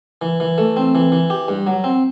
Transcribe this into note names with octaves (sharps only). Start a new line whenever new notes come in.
E3
E3
A3
C4
E3
E3
G4
G2
F#3
C4